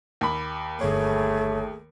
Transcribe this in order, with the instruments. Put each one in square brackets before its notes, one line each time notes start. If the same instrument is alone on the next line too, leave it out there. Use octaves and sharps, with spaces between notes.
[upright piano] D#2 B5
[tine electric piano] G1 C#5 [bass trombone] A3 [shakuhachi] G#4